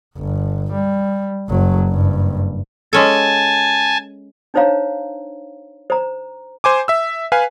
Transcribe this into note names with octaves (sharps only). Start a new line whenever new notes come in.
G1
G3
F#1 F#3
F#1 G2
G#3 C#4 A4 G#5 A5
D4 D#4 C5 C#5 F5 A#5
C5 A#5
C5 G#5 D6
E5 E6
B4 F5 G#5